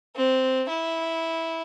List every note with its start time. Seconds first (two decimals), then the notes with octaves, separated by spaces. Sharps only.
0.16 C4
0.69 E4